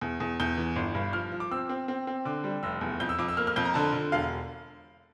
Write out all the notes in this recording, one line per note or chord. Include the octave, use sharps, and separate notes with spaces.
E2
E2
E2 G6
E3
G1
G2
F3 F6
F3
D6
C4 E6
C4
C4
C4
D3 D6
G3
F1 E6
E2
F2 G6
E6
F2 D6
E6
A#3 F6
F6
F2 G6
A#5
D3 A5
D3
E1 F5